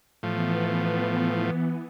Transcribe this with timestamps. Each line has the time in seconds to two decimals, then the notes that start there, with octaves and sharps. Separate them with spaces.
0.23 A2 E3 F3 B3